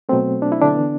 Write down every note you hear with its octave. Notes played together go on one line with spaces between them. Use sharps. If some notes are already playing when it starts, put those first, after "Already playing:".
B2 F#3 A3 C4
D4
E4
D3 D4
E3 B3